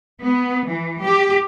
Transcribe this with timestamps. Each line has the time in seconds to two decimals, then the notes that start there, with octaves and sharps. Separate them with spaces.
0.21 B3
0.67 E3
1.03 G4